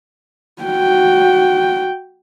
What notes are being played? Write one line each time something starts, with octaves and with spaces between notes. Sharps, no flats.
F#4 G5